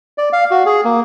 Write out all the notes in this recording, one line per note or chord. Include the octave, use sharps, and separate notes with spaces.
D5
F5
F#4
G#4
A#3